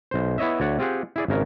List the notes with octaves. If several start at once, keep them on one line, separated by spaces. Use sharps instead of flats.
B1 C5
B3 E4 C#5 D#5 E5
D2 C#5 D5 F#5
C4 F4 G4 G#4 F#5
E4 G#4 D5
G#1 C#3 A#4